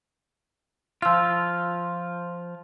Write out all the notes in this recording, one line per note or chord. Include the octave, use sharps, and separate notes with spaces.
F3 F4 C6 E6